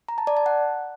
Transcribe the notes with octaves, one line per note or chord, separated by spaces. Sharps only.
A#5
A5
D5
A5
F#5